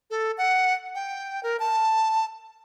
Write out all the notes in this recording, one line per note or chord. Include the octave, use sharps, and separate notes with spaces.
A4
F#5
G5
A#4
A5